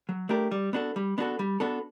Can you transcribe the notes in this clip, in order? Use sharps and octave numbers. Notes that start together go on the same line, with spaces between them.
F#3
A3 D4 G4 A#4
G3
B3 D4 F#4 A4
G3
B3 D4 F#4 A4
G3
B3 D4 F#4 A4